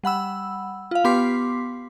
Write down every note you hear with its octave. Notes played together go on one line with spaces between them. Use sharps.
G3 F#5 B5 E6
F4 F5
B3 G4 C6 D6 B6 C7